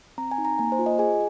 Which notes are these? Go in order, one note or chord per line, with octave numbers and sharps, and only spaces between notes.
C4 A#5
G#5
D#4
A#5
A#3 G#5
C5
F4
D#5
G#4 G#5